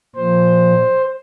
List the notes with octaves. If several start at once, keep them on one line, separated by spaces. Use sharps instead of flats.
A#2 F3 C5